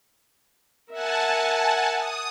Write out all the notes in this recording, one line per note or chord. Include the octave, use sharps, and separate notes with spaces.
A#4 E5 F#5 G#5 A5
D#6